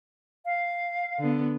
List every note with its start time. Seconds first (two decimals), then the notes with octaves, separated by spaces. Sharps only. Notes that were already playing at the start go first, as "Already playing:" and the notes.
0.44 F5
1.19 D3 B3